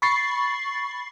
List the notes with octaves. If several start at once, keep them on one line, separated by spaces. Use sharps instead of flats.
B5 C#6 A6 C7